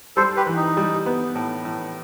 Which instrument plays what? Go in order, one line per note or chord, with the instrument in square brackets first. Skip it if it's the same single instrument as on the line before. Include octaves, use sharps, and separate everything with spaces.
[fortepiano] G3 [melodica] A4 C5
[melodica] G4 B4
[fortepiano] E3
[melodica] D#4
[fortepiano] G3
B3
A2
A2